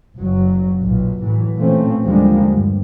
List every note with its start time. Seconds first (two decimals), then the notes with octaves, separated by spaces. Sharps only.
0.15 F#1 F#3
0.81 B1 A#2
1.21 A2 E3 F#3
1.56 A#2 E3 F3 A3 C4 C#4
2.04 D#2 D3 F3 G3 G#3 A#3
2.51 G2